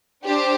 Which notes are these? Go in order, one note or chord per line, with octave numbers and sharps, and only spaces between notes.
D4 G4 C5